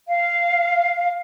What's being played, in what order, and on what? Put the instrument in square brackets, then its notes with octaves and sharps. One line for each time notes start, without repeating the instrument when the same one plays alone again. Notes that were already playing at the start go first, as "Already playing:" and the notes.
[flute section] F5